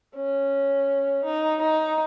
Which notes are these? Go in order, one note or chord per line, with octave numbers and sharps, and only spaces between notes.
C#4
D#4
D#4